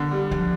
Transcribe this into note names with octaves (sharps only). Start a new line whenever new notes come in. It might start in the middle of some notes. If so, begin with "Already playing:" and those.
Already playing: D3
G3
F3